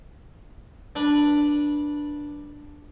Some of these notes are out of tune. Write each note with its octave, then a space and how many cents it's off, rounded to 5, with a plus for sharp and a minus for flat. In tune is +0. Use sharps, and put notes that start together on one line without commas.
D4 +0 B4 -20